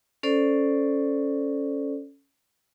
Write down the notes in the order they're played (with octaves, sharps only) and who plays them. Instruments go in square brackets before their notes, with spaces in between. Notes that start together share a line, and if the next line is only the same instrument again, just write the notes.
[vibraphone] C#4 A4 C5 D5